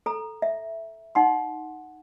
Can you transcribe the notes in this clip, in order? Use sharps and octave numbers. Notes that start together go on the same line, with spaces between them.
A4 A#5
E5
D#4 F#5 C6